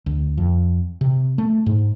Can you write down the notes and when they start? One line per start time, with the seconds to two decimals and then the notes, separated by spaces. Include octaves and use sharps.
0.06 D2
0.38 F2
1.01 C3
1.38 A3
1.66 G#2